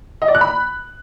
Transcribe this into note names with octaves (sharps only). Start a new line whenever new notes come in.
D#5
D5
F#6
B5